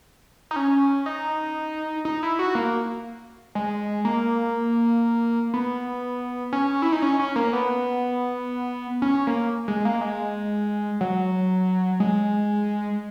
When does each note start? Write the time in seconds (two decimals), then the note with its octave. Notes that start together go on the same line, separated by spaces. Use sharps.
0.51 D#4
0.56 C#4
1.06 D#4
2.05 D#4
2.23 E4
2.39 F#4
2.55 A#3
3.55 G#3
4.05 A#3
5.54 B3
6.53 C#4
6.82 E4
6.92 D#4
7.02 C#4
7.19 C#4
7.36 A#3
7.53 B3
9.02 C#4
9.27 A#3
9.68 G#3
9.85 A#3
10.01 G#3
11.01 F#3
12.00 G#3